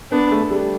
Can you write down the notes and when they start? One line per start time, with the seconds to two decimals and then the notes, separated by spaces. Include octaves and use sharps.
0.12 B3 D4
0.31 A3
0.42 A3
0.51 G3